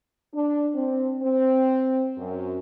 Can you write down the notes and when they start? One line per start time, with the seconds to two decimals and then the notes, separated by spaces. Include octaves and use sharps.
0.34 D4
0.74 C4
1.22 C4
2.18 F#2